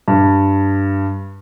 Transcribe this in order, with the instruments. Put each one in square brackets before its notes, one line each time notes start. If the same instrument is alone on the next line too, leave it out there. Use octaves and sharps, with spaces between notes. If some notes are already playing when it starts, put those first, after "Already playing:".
[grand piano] G2